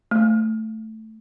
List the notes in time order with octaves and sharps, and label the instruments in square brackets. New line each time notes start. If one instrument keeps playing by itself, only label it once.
[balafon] A3